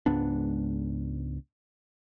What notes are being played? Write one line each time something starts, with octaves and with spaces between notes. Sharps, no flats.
C#2 G#2 B3 D4